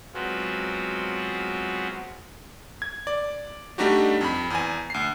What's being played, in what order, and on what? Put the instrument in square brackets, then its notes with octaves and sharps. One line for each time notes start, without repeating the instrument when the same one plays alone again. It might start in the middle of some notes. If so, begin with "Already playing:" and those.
[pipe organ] F#3 G#3 B3 C4 F4 F#4
[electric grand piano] G#6
D5
G3 A3 D4 D#4 F#4 G4
F2 B5
E2 G#5
D2 C7